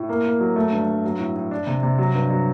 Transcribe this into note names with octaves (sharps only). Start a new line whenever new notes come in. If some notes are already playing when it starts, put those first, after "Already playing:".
Already playing: A2
A#3
A#3
F#3
A3
G2
G2
F#3
A2
A2
D4
C3
C3
F#3
G2
F#3